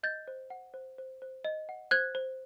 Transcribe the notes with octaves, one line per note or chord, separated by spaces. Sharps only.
D#5 G6 A6
C5
F#5
C5
C5
C5
D#5
F#5
C5 F#6 G#6
C5